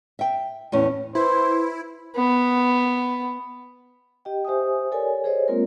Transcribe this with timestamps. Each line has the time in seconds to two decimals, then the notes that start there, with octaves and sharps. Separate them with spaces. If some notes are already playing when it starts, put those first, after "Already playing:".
0.19 E5 G5
0.72 E2 A2 C#4
1.15 E4 B4 C5 C6
2.16 B3
4.25 G4 D#5 G5
4.45 G4 C5 E5 G#5 D#6
4.92 G4 A4 A#4 C#5 D5 G#5
5.24 G#4 A4 C5 C#5 D#5
5.48 G#3 A#3 C4 F4 A#4